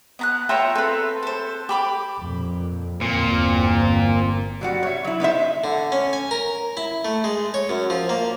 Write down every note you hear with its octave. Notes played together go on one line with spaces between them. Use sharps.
B3 A#5 F#6
F4 B4 C#5 E5 G5 A#5
C4 A4 B4
A4 C5
G4 B5 D6
F2 A#2
G1 E2 A#2 C4
F#3 G3 F#4
C#5 E5
F#3 E4
B3 D#4 C5 E5
D3
C#4
G#5
A#4
E4
A3
G#3
C#5
F#2
F3
A#3